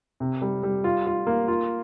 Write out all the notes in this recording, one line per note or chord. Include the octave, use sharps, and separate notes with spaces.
C3
G3
G3
F4
F4
A#3
F4